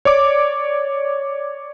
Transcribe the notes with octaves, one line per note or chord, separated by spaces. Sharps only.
C#5 D5 D6